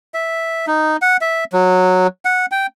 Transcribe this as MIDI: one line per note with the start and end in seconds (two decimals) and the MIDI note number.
0.14 0.66 76
0.67 0.97 63
1.02 1.17 78
1.21 1.44 76
1.53 2.07 54
2.25 2.46 78
2.51 2.66 79